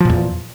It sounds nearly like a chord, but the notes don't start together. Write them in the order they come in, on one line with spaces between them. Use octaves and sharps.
F3 A#2 E2